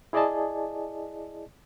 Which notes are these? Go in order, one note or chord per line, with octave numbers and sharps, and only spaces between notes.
E4 G#4 D5 D#5 G#5 A5